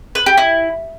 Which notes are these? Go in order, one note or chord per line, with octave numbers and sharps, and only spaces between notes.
B4
G4
E4